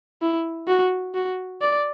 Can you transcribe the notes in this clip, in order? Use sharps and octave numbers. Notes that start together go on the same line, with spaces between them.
E4
F#4
F#4
D5